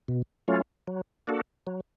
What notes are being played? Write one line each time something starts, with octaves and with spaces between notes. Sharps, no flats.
B2
F#3 A3 C#4 F4
F#3
A#3 D4 F#4 A4
F#3